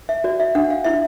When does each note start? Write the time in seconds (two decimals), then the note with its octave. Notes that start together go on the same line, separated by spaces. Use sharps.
0.09 E5
0.24 F#4 D5
0.40 E5
0.55 D4 F#5
0.70 F5
0.84 E4 E5